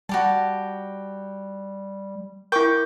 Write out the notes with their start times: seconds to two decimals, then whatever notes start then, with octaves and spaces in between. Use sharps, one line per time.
0.09 G3 F#4 G4 A5
2.52 E4 A#4 G5 C#6 D6 G6